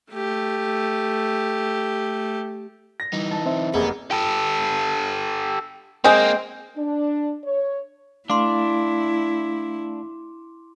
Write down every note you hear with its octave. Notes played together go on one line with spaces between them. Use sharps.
A3 G4
A#6
E3 G3 D#4
A5
C4 C5 E5
F1 A#3 B3 G#4 A#4
G4 A4
G#3 A#3 C4
D4
C#5
A3 D4 E4 F5 C6 D6